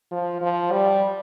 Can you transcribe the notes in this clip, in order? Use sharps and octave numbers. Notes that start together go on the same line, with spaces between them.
F3
F3
G3